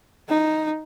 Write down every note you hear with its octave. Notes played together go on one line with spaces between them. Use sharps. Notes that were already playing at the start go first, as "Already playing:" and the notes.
D#4